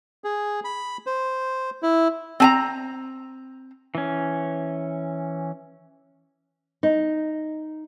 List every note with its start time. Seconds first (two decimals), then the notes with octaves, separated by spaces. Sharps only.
0.24 G#4
0.64 B5
1.06 C5
1.83 E4
2.40 C4 G#5 A#5
3.95 E3 C#4
6.83 D#4